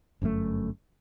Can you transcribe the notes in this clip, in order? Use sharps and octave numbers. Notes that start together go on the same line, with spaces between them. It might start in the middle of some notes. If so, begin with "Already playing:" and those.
G1 F#2 A2 A3